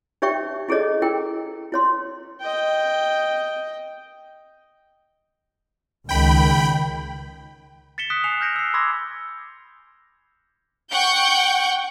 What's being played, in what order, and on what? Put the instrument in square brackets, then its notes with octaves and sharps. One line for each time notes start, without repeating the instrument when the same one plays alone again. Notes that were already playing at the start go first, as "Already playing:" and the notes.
[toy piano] D#4 G4 C#5 E5 G5 C#6
E4 G#4 A4 C#5 D#5
E4 A#4 G5
E4 C#5 C6
[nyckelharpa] D#5 G5
[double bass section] C#2 D#3 [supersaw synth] G5 B5
[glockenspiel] A6 B6 C#7 E7 G7
D#6 F#6 B6 D7
G#5 F#6 C7 C#7 E7 F7
F6 G6 A#6 C#7 D7
E6 C7
B5 C6 D6 E6 G#6 A#6
[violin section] F#5 G5 C#6 G6